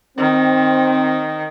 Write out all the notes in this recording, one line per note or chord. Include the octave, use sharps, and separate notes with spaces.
D#3 C4